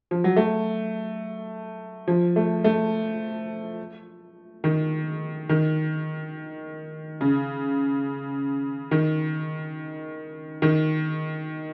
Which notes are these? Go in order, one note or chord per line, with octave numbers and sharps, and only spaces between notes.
F3
F#3
A3
F3
A3
A3
D#3
D#3
C#3
D#3
D#3